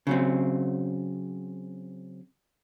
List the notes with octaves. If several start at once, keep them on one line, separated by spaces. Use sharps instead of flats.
C#3 F#3 C4